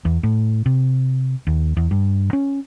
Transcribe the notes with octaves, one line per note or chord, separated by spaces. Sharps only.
E2
A2
C3
D#2
E2
G2
C#4